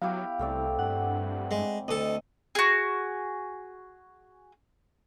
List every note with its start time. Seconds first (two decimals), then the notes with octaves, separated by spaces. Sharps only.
0.02 F#3 B3 E4 G4 F5
0.39 C2 A3 C4 D5
0.79 G2 F#5
1.51 G#3
1.88 D2 D4 A4 D#5
2.55 F#4 G#4